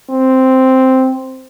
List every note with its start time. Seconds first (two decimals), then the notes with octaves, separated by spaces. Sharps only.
0.10 C4